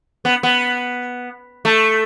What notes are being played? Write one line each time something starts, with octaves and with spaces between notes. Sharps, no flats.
B3
B3
A3